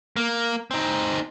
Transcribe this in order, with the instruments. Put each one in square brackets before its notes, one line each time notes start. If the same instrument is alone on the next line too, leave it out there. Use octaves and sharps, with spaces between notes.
[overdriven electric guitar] A#3
C4 D#4